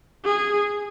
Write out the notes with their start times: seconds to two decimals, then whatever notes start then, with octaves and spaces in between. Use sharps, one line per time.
0.25 G#4